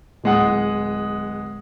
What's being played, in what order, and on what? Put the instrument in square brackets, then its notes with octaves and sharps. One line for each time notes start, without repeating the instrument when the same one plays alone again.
[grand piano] D1 G#3 F#5 D#6